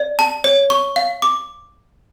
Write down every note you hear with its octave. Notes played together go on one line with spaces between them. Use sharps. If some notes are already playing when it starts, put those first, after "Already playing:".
Already playing: D5
A5
C#5
C#6
F5
D6